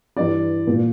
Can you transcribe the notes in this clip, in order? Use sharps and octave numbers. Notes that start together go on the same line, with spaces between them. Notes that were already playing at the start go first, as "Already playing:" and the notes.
G2 E3 D5
A#2